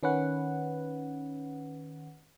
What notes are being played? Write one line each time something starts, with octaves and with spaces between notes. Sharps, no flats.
D#3 C#4 B4 F#5